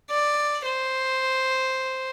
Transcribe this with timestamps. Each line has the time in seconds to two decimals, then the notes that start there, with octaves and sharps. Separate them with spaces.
0.10 D5
0.65 C5